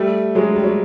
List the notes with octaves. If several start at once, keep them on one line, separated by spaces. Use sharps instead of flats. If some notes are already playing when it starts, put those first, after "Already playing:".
Already playing: G3 A3
F#3 G#3
G3
F#3